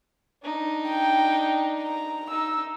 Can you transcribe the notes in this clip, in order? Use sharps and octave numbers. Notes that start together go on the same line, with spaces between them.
D4 D#4
G5
A#5
D#4 E6